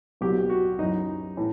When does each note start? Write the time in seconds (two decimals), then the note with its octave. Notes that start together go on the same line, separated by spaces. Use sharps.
0.21 C2 B2 F#3 G4
0.50 F#4
0.79 F#2 E3 D#4
1.37 A2 E3